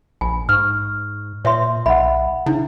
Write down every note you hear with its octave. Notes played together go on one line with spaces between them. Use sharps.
A#1 G#5 B5
G#2 C#6 F6
A#2 C#5 E5 C6
B1 D#5 E5 F#5 B5
C#3 D4 E4